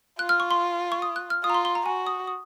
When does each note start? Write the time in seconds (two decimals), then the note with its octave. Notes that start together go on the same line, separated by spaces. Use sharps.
0.19 F4 F#6
0.29 F6
0.40 C#6
0.51 C6
0.92 C#6
1.02 D#6
1.16 F#6
1.30 F6
1.44 F4 D#6
1.50 A#5
1.54 C6
1.65 C6
1.75 A#5
1.86 F#4 G#5
2.07 D#6
2.27 D#6